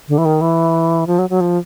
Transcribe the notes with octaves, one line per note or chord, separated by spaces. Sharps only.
D3
E3
D#3
E3
F3
F#3
F#3
F3